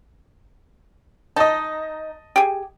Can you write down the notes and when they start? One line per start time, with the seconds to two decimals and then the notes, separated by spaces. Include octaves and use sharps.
1.36 D#4 D#5 A5
2.36 G4 G#4